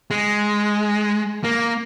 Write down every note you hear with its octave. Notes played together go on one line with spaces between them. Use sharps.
G#3
A#3